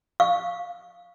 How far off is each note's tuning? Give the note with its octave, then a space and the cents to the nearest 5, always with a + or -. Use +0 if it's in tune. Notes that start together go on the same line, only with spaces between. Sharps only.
F5 +0 C#6 +0